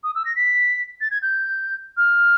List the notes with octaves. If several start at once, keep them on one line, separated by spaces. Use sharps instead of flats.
D#6
E6
A#6
B6
A6
G#6
G6
F6